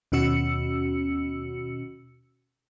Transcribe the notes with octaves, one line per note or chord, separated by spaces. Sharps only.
D#2 B2 C#4 F#4 E6 C#7